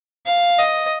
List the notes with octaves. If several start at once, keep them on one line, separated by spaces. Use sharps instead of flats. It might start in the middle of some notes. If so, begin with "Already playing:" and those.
F5
D#5